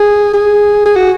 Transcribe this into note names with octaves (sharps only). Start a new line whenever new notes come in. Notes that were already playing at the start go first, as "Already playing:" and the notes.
Already playing: G#4
G#4
G#4
F#4